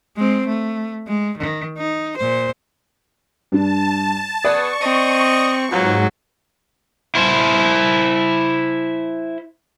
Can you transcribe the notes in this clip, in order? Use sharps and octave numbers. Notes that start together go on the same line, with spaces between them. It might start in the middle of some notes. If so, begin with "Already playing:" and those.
G#3 C4
A3
G#3
D#3
D#4
A#2 C5
G2 D4 A5
B3 G#4 B4 D5 C#6
C4 D#5
D#2 G#2 F#3 B3 F4
E4 C5